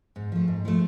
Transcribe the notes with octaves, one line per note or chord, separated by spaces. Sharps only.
G#2
F3 A3
G#2
F3 A3